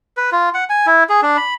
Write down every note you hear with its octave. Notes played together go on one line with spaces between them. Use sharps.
B4
F4
F#5
G#5
E4
G#4
D4
B5